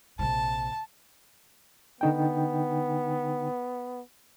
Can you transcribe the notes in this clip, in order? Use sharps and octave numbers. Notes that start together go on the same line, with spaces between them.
A#1 C3 A5
D3 B3 D#4 G5